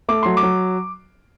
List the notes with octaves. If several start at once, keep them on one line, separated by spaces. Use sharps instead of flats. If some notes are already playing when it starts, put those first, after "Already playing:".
A3 D6
F#3 C6
D6
F#3